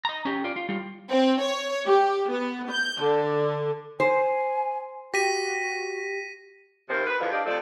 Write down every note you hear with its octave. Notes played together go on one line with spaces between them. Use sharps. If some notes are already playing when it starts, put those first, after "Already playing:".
D#5 A#5
C#4 G4
F4 D5
F4
G3 F4
C4
C#5
G4
B3
G6
D3
C5 G#5
F#4 G4 A#6 B6 D#7
D#2 C3 F3 A#4 C5
B4
E2 B2 D3 F3
D4 G4 D5 D#5 F5
C3 F3 A3 F4 D5